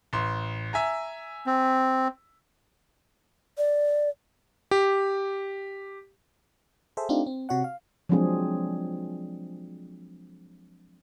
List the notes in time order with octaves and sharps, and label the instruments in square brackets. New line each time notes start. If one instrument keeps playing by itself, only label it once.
[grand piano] A1 C6
E5 G#5 A#5
[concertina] C4
[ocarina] D5
[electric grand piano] G4
[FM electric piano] G#4 A4 C5 E5
A3 C4 D4 D#4 F4 G4
C4
C3 F#4 C#5 F#5
F5
[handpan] F3 F#3 G#3 C4 D4 G#4